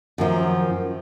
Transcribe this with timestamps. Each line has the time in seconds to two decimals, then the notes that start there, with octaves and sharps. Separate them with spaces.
0.18 F#2 D#3 F3